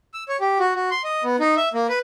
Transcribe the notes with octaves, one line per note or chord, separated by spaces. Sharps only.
E6
C#5
G4
F#4
F#4
C6
D#5
B3
D#4
E5
A#3
B4